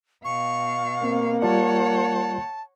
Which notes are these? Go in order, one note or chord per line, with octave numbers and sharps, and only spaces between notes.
B2 F5 C#6
A#3 C4
G3 F4 C#5 D5 F#5 A5